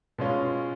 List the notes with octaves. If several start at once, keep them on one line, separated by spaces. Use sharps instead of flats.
B2 G#3 C#4 F4